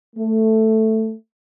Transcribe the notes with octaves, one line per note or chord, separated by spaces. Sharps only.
A3